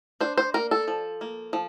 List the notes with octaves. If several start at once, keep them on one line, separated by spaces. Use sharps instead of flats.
D4 C5
C5
A#3 A#4
A4
F3
A#3
F3